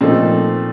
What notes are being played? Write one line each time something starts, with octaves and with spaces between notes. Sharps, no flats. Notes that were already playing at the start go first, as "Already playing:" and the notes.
A#2 F3 A3 C4 D#4